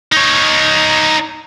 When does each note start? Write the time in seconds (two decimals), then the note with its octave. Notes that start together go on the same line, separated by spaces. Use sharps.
0.12 D#4 C#5